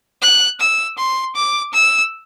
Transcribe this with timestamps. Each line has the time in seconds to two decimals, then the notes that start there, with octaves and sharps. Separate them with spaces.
0.22 F#6
0.60 E6
0.98 C6
1.35 D6
1.74 E6